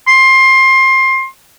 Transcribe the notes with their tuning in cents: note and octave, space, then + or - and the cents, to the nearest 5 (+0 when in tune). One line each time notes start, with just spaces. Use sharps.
C6 +20